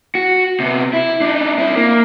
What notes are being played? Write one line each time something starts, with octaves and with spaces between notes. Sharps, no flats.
F#4
C3 B3
E4
D4 D#4
C4 E4
A#3